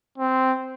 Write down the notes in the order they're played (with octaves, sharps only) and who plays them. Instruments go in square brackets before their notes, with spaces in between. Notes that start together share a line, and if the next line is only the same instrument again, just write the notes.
[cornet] C4